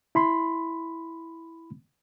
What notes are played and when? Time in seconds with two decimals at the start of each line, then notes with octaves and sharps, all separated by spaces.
0.15 E4 B5 C6